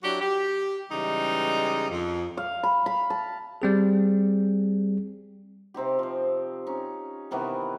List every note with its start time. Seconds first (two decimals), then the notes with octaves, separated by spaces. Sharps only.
0.03 F#3 D4 E4 F#4 G4
0.21 G4
0.91 C#3 E3 G3 G#3 D#4
1.91 F2
2.37 F5
2.63 B5
2.86 B5
3.10 A5
3.62 G3 C4 G#4
5.74 C3 C4 D#4 G4
5.99 F3 C5
6.67 C#4 D#4
7.31 C3 D#3 E3 B3